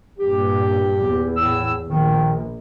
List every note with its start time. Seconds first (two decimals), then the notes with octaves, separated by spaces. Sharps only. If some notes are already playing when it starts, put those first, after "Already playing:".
0.18 G2 A#2 G4
1.01 E2
1.37 A2 E6
1.89 A#1 D#3